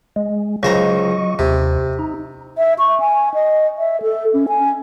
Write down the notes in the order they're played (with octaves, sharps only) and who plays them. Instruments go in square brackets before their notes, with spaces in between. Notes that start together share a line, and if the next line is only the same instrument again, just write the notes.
[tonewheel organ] G#3
[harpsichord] C#2 C5 A#5 [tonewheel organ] F#3 D#5 C#6
[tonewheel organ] D#2 [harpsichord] C3
[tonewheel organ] D#4
[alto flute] E5
C#6
G#5
D#5
E5
A4
C#4
G#5